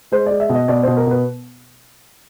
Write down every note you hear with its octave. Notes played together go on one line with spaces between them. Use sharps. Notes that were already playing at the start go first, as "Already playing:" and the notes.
G#3 C5
G#3 D5
E5
B2
D#5
B2 D5
B2 C5
A#4
B2 B4